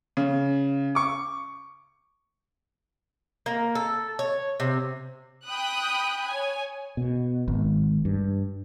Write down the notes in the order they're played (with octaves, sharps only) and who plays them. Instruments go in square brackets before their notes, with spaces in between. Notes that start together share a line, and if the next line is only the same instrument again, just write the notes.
[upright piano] C#3
C#6 D6
[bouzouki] A#3
A4
C#5
C3
[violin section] G5 B5 D#6 F#6
C#5 G#5
[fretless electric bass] B2
G#1
G2